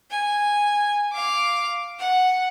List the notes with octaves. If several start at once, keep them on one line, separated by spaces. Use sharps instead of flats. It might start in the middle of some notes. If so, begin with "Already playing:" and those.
G#5
F5 D6
F#5